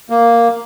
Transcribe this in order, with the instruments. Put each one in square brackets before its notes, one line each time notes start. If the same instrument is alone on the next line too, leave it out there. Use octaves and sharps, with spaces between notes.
[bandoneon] A#3